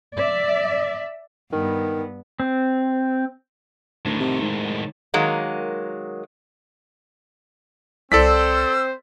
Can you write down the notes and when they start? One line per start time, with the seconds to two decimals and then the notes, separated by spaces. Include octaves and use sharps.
0.17 D5 E5
1.52 G2 D#3 B3
2.40 C4
4.05 D2 A2 D#3
4.20 C3
4.42 G#2
5.14 D#3 F#3 G#3 A#3
8.12 C2 C4 A4 C5 D5 E6 B6